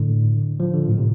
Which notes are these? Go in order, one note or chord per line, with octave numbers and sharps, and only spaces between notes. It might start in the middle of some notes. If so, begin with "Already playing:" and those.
Already playing: A2 D3
F3
D3
A2
C3